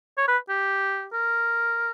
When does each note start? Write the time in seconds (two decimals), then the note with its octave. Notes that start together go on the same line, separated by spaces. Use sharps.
0.18 C#5
0.28 B4
0.49 G4
1.13 A#4